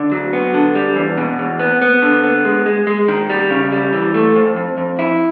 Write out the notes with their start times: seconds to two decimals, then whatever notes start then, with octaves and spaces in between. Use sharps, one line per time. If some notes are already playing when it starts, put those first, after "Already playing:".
Already playing: D3
0.12 F#3
0.33 B3
0.54 D3
0.75 G3
0.96 E2
1.18 B2
1.39 E2
1.59 B3
1.82 B3
2.02 D3
2.24 B3
2.45 G#3
2.66 G#3
2.87 G#3
3.08 D#3
3.30 G3
3.50 C#3
3.72 G3
3.93 E3
4.14 A3
4.35 F2
4.56 F2
4.78 F2
4.99 E4